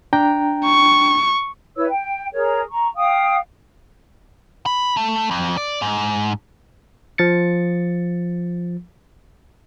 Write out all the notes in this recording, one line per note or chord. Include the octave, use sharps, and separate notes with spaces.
D4 G5 A#5
C#6
E4 B4 C#5 E6
G5
G#4 A#4 C#5
A#5 C#6
F5 G5 D#6
B5
A3
F2
D5
G#2
F3 A6 C#7